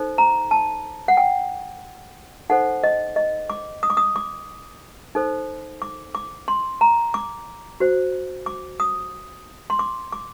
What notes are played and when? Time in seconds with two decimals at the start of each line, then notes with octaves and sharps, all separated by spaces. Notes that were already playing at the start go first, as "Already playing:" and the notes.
Already playing: D#4 A4 C5
0.18 A#5
0.51 A5
1.08 F#5
1.17 G5
2.50 D#4 A4 C5 F#5
2.84 D#5
3.16 D#5
3.50 D6
3.83 D#6
3.90 D6
3.97 D#6
4.16 D6
5.15 D#4 A4 C5
5.82 D6
6.15 D6
6.48 C6
6.81 A#5
7.14 D6
7.80 F#4 C5
8.46 D6
8.80 D#6
9.70 C6
9.79 D6
10.12 D6